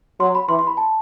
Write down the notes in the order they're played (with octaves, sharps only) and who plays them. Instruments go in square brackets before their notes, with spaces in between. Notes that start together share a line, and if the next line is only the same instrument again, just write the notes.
[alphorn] F#3 [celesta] C6
[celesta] B5
[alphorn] E3 [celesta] C6
[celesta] C6
B5
A5